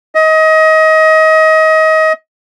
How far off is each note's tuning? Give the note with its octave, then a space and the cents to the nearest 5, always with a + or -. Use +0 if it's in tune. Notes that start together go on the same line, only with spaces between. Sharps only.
D#5 +25